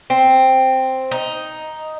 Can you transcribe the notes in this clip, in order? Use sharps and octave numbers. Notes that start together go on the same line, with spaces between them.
C4
D#4